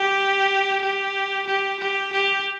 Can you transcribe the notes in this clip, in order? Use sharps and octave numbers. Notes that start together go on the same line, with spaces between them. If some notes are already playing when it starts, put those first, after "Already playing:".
Already playing: G4
G4
G4
G4
G4